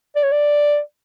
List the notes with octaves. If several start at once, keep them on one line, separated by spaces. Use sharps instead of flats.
D5
C#5
D5